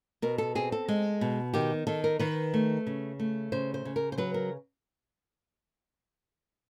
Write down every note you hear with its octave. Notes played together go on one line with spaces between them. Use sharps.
B2 A#4
A4
C4 G#4
A4
G#3
B2
D#3 G4
D#3 A4
A#4
D#3 B4
A3
C#3
A3
C#3 C5
C5
C#3
A#4
C5
F#3 B4
A#4